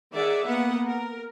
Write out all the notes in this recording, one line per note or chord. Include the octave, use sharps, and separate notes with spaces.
D#3 G#4 D5 E5 F#5
A#3 B3 B4 F#5
A#4